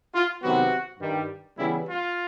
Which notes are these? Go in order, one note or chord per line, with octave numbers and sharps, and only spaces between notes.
F4
C3 D#3 F#3 B3 F#4
G2 D#3 G3
C#3 E3 G3 B3 E4
F4